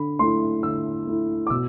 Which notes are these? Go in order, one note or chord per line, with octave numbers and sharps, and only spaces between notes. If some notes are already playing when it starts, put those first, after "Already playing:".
Already playing: D3 B5
A3 E4 C6
D3 E6
A3 E4
D6
B2 E6